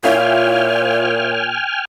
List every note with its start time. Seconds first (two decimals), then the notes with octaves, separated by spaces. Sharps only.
0.04 A#2 E4 F4 C#5 G5 G#5 F6